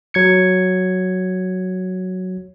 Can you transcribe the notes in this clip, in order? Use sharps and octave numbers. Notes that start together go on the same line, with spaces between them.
F#3 G#6 C#7